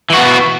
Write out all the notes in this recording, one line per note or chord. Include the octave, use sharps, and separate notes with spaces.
E3 B3 F#4